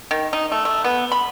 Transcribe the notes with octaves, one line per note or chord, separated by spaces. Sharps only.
D#3
D#4
A3
A3
B3
B5